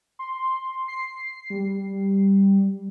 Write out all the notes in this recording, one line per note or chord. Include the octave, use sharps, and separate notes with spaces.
C6
C7
G3